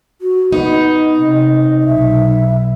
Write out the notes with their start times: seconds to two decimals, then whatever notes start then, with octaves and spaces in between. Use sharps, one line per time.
0.21 F#4
0.52 B3 D#4 D#5
1.17 C3
1.86 B1 E5